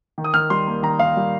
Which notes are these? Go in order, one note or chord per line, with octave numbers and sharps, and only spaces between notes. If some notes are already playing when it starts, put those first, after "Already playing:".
D#3
D#6
D#3 F6
G3 C6
A#3
D#3 A#5
D#3 F5
G3